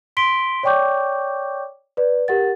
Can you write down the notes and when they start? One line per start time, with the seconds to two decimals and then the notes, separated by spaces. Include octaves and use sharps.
0.17 C6 B6 D7 G7
0.63 C#5 D5 G5 C#6 D6 G6
1.97 B4 D5
2.28 G4 A#4 F#5 A6